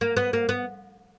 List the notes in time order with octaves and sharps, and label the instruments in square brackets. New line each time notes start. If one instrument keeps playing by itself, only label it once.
[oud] A#3
B3
A#3
B3